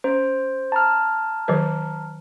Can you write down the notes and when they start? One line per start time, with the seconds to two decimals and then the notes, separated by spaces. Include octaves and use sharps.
0.04 C#4 C5
0.72 A5 A#5 F6
1.48 D#3 F#3 B4